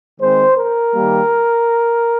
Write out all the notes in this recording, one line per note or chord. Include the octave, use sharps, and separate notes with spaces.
D#3 G#3 C4 C5
A#4
D#3 G3 A#3